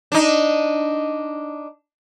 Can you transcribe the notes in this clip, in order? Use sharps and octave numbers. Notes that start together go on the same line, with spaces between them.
D4 D#4